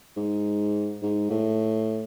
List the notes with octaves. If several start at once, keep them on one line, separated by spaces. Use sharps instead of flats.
G#2
G#2
A2